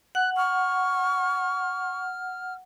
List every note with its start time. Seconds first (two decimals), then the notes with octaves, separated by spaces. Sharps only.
0.15 F#5 F#6
0.37 C#6 F6